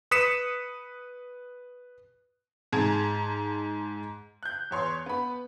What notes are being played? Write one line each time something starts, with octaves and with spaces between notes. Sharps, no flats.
B4 D#6 B6 C#7 E7
G#2 G#4 A5 A#5 G#6
F#6 G6
E2 C#5 C6
B3 B5